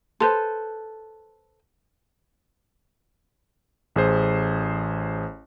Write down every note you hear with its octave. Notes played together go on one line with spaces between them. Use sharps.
A4 B4 C5 A5 C6
A1 G#4 C5